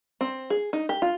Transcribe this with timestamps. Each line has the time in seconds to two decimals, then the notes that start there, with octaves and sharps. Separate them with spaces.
0.21 C4
0.50 G#4
0.73 D#4
0.89 G4
1.02 F4